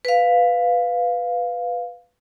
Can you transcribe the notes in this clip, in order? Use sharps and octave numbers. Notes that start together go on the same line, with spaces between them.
B4 F5